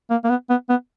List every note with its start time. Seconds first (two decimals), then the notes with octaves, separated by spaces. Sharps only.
0.10 A#3
0.24 A#3
0.30 B3
0.50 B3
0.69 B3